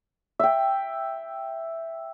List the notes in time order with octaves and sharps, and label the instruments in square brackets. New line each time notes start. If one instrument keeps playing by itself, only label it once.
[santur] E5 G5